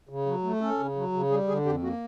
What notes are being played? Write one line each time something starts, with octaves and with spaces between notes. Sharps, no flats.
C#3
F#3
A3
C#4 A4
C#3
F#3
C#3
G3 G#4
D3 G#4
F2 G4
A#3 F#4